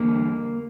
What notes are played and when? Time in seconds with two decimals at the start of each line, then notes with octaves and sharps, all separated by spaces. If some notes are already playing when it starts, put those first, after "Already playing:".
Already playing: E2 D3 G3 A#3